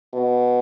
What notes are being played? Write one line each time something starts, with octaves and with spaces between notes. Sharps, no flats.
B2